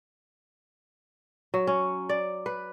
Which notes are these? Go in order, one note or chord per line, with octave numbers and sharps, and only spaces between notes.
F#3
C#4
D5
B4